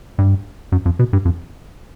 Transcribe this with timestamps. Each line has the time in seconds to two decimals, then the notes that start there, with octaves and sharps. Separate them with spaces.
0.18 G2
0.72 F#2
0.86 F2
0.99 B2
1.13 G2
1.25 F2